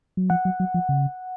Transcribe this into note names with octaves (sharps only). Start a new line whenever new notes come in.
F#3
F3 F#5
F#3
F#3
F3
C#3